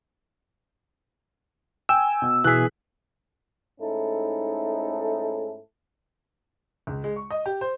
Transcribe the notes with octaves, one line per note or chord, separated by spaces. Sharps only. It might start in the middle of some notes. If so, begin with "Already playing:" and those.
G5 G#5 E6
B2
B2 E3 G#4 F#6 B6
G#2 A3 C#4 D#4 E4 A4
C#2
G#3
C#6
D#5
G4
C5